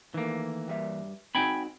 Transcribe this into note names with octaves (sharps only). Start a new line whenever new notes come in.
D#3 E3 A3 A#3
G2 G3 E5
C4 D#4 F#4 G5 G#5 B5